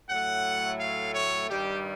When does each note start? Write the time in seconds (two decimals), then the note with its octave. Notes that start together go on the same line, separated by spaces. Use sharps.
0.09 A2 F#3 A3 F#5
0.79 F5
1.15 C#5
1.49 G2 D#3 G3 G4